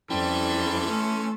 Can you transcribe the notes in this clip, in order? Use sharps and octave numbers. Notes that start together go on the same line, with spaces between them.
F2 E3 G3 C#4 E4 A4 G5 C6
A3 C#4